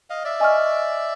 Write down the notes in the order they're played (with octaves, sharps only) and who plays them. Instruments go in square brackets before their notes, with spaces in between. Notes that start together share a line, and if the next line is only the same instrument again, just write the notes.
[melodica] D#5 F5
D5 E5
[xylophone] D#5 G#5 C#6 F6